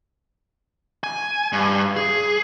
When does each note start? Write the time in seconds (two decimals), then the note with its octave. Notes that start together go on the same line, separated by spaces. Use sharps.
1.04 G#5
1.53 G2
1.96 G#4